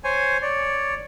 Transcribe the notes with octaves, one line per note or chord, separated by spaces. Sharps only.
C5 C#5 G#5
C#5 D5